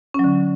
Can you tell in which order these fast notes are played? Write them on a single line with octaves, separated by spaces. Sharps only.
C#4 F#3 D3